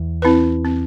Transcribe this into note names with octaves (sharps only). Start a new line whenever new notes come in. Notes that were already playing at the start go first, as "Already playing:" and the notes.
Already playing: E2
C4 E4 B4
C4